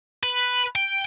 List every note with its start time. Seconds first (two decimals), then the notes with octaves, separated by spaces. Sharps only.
0.23 B4
0.75 G5